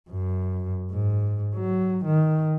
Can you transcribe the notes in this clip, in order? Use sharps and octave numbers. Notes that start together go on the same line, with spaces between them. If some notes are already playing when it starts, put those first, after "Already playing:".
F#2
G#2
F#3
D#3